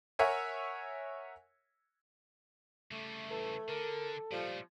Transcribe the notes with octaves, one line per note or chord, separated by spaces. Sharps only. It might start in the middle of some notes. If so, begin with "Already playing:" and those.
A#4 C#5 E5 F#5 G#5
C#3 G3 A3
E3 A4
D3 A#4
A#2 F3 G3 A3